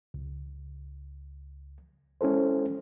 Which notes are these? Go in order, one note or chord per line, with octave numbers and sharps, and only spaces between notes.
C#2
G#3 C#4 E4 A4 C5